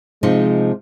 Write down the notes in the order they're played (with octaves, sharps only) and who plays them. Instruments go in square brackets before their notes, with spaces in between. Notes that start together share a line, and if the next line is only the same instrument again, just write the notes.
[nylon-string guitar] C3 F3 D#4 [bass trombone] G#3